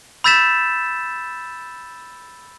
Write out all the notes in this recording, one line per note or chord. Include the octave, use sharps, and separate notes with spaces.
B5 E6 G6 A6 B6 E7